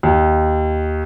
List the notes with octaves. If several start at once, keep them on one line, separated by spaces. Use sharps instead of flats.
D#2